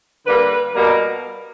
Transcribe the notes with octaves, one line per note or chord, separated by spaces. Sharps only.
D3 G3 A#3 B4
B2 G3 A#3 A#4